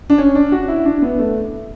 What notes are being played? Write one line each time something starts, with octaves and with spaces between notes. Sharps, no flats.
D4
C#4
D4
F#4
E4
D4
B3
A3